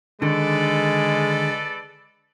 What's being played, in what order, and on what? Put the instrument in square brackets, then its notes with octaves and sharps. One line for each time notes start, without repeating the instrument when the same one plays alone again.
[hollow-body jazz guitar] D3 D#3 [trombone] G#3 [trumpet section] A4 B4 D5